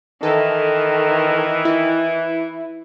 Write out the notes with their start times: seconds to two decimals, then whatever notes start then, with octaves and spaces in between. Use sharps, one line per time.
0.23 D#3 E3 A4
1.65 E4